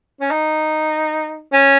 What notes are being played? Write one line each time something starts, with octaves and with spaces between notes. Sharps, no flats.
C#4
D#4
C#4